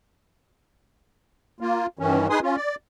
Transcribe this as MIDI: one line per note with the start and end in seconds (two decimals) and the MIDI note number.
1.61 1.86 58
1.61 1.86 65
1.99 2.27 43
1.99 2.27 51
1.99 2.27 52
1.99 2.27 61
2.30 2.40 63
2.30 2.40 68
2.30 2.40 71
2.30 2.40 80
2.30 2.40 84
2.30 2.40 87
2.42 2.56 61
2.42 2.56 65
2.56 2.75 74